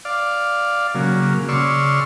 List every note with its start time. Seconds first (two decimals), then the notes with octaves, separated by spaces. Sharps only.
0.05 D5 F5
0.95 C#3 F#3 A#3
1.48 C#3 D5 C6 C#6 E6 F6